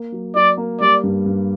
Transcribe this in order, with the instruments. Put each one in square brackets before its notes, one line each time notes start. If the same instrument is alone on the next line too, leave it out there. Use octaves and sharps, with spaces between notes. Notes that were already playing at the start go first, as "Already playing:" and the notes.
Already playing: [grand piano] A#3
F#3
[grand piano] F#3 [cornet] D5
[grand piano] A#3
[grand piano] G3 [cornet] D5
[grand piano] G2
G2